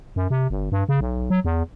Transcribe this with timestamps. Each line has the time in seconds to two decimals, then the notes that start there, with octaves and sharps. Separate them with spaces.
0.16 F#2
0.30 C3
0.50 G1
0.72 G2
0.89 C#3
1.01 B1
1.30 F#3
1.45 E2